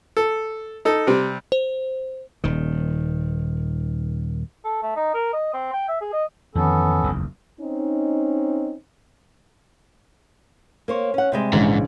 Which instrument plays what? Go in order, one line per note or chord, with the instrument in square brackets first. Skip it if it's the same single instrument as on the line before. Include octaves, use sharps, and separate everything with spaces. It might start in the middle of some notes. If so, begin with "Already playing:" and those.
[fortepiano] A4
D#4 A4
C3 G3 C4
[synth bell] C5
[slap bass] D#1 D#3
[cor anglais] A4
A3
D#4
A#4
D#5
C4
G5
E5
G#4
D#5
[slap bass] F2 D#3 E3 [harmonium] B3 C#4 A4
[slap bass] F#1 B1 E2
[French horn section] C4 C#4 D#4
[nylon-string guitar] A#3 C5 C#5
C#4 F#5
C3 G3 G#3
[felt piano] A#1 C#3 E3 [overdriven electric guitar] G#2